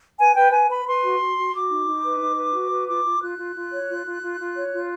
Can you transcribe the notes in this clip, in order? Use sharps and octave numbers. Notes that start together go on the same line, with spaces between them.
B4 G#5
B4 G5
B4 G#5
B4 B5
B4 C6
F#4
F#4
F#4
F#4 D6
D#4
D#4
B4
D#4
B4
F#4
B4
F4 D6
F4
F4 F#6
F4
F4
C#5
F4
F4
F4
F4
C#5
F4